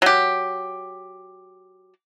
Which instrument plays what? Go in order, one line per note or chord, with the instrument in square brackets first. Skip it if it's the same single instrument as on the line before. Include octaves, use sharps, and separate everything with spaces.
[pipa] F#3 G4